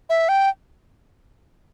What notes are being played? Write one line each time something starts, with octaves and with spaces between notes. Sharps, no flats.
E5
G5